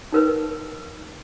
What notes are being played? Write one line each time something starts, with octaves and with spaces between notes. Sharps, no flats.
D#4 A#4 B4